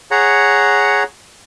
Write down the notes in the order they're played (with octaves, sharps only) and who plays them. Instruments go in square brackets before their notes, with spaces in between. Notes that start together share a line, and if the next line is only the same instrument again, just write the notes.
[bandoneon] G#4 C#5 F#5 A#5